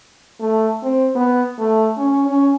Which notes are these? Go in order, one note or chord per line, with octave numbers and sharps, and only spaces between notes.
A3
C4
B3
A3
C#4
C#4